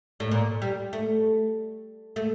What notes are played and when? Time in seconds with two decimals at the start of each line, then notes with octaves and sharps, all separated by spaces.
0.20 A2
0.31 A#2
0.62 G3
0.93 A3
2.16 A3